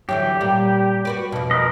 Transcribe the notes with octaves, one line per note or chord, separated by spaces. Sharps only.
D3 E3 F#3 G4
A#2 G3
F#4 B4 D5
F2 B2
A#4 B4 D#5